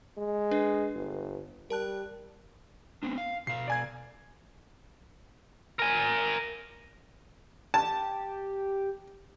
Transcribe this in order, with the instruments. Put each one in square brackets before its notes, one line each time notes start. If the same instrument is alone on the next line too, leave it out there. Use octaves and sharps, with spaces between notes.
[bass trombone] G#3
[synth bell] D4 B4
[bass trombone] G1
[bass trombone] G3 [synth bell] A#4 A5 F#6
[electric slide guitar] B3 C4 D4
F5
[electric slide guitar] B2 F5 [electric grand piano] C7
[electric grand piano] D5 G#5 G#6
[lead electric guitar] A#4 G#5
[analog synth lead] G4 [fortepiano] A5